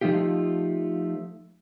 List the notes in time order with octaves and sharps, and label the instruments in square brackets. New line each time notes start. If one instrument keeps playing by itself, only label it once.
[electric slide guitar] F3 A3 D#4 F4 G4